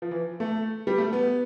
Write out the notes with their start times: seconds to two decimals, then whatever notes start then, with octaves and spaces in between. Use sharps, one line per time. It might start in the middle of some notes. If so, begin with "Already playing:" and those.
0.02 F3
0.11 E3
0.40 A3
0.87 G3
0.98 A3
1.13 B3